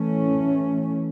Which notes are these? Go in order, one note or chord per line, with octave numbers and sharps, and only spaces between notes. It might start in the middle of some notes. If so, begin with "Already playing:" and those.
Already playing: E3 A3 C#4